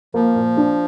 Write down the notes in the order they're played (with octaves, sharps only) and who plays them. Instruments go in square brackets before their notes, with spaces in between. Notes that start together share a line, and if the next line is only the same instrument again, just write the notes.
[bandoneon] F3 [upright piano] A#3
[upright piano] A#2
D4